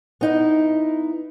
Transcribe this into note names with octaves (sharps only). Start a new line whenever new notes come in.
B3 D#4 E4